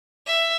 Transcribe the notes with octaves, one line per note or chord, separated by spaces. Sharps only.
E5